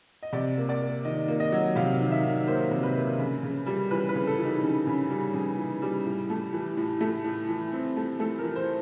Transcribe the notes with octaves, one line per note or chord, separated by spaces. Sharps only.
D#5
C3 D5
A#3
D5
A#3
D#3 D#5
A#3
D#5
F#3
C3 F5
D#3
E5
D#3
A#3 C5
C3
B4
A#3
C#3
C#3
G3
E3 B4
B4
C#3
A4
E3
D#4
C#3
C#3
G3
C#3 G#4
E3
G3
A2
A3
E3
A2
A3
A2
E3
C4
A3
A3 A4
A#4
E3
C5